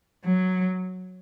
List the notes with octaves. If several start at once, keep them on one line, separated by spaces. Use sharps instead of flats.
F#3